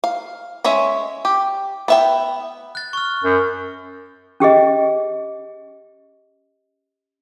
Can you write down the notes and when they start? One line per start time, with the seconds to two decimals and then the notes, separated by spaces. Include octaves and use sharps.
0.04 F5
0.64 G#3 C#4 C#5 E5
1.25 G4
1.88 B3 E5 G5
2.75 F#6 A6
2.93 C#6 F6
3.24 F#2
4.40 C#4 G4 G#4 D#5